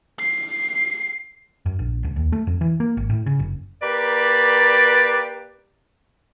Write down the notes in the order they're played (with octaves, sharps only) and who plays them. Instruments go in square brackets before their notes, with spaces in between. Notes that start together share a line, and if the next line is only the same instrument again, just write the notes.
[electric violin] C7
[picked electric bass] F#2
A#1
C#2
D#2
A3
F2
E3
A#3
G#1
A2
C#3
F#1
[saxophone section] A#3 G4 B4 D5